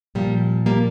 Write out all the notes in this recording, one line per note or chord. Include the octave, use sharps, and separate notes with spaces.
A#2 F3 G3
G3 A#3